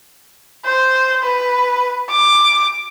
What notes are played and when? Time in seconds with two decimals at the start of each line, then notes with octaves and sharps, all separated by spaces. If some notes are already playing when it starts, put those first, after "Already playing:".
0.65 C5
1.23 B4
2.10 D6